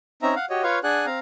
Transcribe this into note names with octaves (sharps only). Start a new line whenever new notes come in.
C4 C#4 D#4 E5 A#5
F5 F#5
F#4 G4 C#5 D#5
F4 B4 C#5 F5 C#6
D4 G#4 D5 F#5 G#5 F#6
C4 F5 A#5